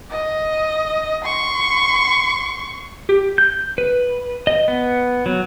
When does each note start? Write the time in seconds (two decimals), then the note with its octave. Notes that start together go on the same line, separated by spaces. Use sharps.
0.11 D#5
1.25 C6 C#6
3.09 G4
3.38 G6
3.78 B4
4.47 D#5
4.68 B3
5.26 F#3